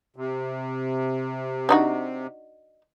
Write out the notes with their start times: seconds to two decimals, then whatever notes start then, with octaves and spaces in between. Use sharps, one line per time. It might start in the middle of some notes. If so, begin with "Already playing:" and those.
0.16 C3
1.69 D4 D#4 F#4